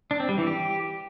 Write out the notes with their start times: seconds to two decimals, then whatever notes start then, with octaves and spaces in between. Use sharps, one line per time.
0.11 D4
0.20 C4
0.29 G3
0.38 E3
0.47 G4